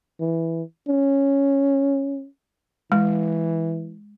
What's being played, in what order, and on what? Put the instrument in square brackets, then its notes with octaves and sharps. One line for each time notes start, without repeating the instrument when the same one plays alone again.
[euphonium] E3
C#4
[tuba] E3 [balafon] G#3